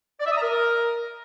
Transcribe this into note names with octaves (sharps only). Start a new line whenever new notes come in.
D5
E5
D#6
A#5
A#4